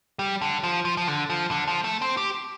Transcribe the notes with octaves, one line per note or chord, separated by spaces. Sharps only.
G3
D3
F3
F3
F3
D3
F3
D3
F3
A3
C4
G4